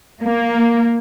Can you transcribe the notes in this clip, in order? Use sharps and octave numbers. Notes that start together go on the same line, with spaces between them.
A#3